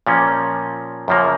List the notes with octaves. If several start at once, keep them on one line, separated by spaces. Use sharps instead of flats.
A#2 F3 A#3 C#4
F#2 C#3 F3 A#3